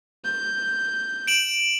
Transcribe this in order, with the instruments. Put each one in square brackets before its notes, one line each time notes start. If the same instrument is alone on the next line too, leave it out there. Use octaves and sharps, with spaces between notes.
[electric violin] G6
[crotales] D7 E7 F#7